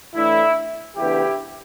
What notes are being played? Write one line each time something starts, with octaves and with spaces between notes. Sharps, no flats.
A2 E3 A3 D4 E4
D2 C#3 E3 B3 D4 E4 G4